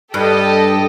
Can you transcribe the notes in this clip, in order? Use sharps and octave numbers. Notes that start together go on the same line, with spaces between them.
G2 G4 A4 D#5